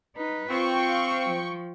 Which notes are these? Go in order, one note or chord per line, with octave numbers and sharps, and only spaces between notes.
D#4 B4
C4 F4 G5 C#6
F5
F3